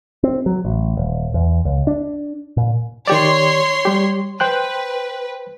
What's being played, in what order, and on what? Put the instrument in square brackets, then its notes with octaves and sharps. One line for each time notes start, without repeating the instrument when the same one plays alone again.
[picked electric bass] C4
F#3
A1
D#1
E2
C#2
D4
A#2
[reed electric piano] D#3 G4 D5 [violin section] C#5 C6
[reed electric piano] G3 G4
[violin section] B4 [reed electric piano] C5 G5 F#6